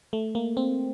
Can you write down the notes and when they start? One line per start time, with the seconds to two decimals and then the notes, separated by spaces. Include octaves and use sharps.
0.13 A3
0.35 A#3
0.57 C4